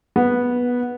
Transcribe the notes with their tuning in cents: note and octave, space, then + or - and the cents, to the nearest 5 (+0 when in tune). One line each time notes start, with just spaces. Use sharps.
B3 -10